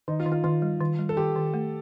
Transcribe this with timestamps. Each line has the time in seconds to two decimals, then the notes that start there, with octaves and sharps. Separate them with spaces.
0.08 D#3 D#4
0.20 F4
0.26 D#3
0.32 F4
0.44 D#3 F4
0.62 G3
0.81 D#3
0.99 G3
1.09 A4
1.17 D#3 G4
1.36 D#3
1.54 A3